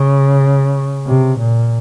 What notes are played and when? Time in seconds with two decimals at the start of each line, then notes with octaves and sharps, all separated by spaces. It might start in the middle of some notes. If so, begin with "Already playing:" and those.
Already playing: C#3
1.08 C3
1.39 A#2